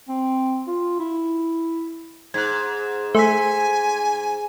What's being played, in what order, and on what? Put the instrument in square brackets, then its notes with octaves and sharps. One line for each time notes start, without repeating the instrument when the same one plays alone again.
[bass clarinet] C4
F4
E4
[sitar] G#2 [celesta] F#6 G#6
[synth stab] A3 [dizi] G#5 [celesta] C6 B6